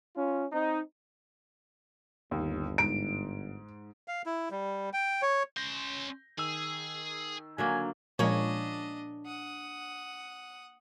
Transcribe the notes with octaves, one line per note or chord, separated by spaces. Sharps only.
C#4 F4
C4 D#4
G1 D#2
G#2 D7
F5
E4
G3
G5
C#5
C#4 C6 G6 A#6
D#3 G#4 E6
D3 F#3 A#3 G#5
A#2 F3 G#3 A#3 C#4 D4 C#5 D#5
F#5 D#6